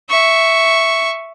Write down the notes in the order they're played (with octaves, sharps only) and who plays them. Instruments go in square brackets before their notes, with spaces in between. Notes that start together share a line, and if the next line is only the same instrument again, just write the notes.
[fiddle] E5 C#6